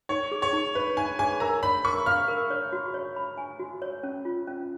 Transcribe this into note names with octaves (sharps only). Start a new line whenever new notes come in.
D#4 C#5
G#4
C#5
D#4
B4 C#5
D#4 G#5
G#4 G#5
A#4 A#5
C#5 B5
A#4 C#6
F5 F6
A#4
C#5
F#4
C#5
B5
G#5
F#4
C#5
C#4
F4
C#4